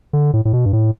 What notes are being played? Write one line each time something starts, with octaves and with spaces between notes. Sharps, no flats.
D3
A2
A2
B2
G2
A2